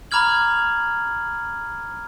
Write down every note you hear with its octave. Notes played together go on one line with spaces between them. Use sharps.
A#5 B5 D6 F6 G#6 F#7